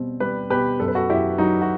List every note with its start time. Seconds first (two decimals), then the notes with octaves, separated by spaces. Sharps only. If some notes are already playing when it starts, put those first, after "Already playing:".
Already playing: B2 G3 C4
0.20 G3 G4 B4
0.50 B2 G4 B4
0.80 F#2 A4
0.88 B4
0.95 F#4 A4
1.10 F#2 E4 G4
1.38 F#3 D#4 F#4
1.62 F#4